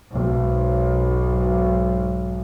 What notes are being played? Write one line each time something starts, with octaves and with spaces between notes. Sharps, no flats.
B1 G#2